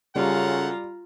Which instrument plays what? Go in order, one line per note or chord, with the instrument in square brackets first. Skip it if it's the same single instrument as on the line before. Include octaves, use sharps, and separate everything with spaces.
[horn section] F#2 A4 F#5 [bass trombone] C#3 [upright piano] G3 [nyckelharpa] F4 A#5